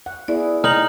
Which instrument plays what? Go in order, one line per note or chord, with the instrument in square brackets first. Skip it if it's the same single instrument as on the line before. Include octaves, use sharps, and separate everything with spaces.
[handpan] F#5
[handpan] B3 E4 G#4 [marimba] D5
[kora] D#4 [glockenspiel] F6 F#7